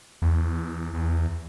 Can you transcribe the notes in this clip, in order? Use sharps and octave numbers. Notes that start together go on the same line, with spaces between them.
E2
E2